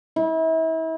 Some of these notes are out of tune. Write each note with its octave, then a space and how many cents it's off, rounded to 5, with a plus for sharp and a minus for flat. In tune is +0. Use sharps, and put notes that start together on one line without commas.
E4 -35